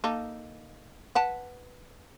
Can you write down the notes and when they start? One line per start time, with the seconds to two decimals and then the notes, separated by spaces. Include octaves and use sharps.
0.04 A#3 D#4 A4
1.15 B4 F#5 A5